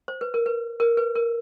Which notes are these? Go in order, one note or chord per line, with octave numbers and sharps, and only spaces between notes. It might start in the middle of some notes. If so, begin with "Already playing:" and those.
C5
B4
A#4
B4
A#4
B4
A#4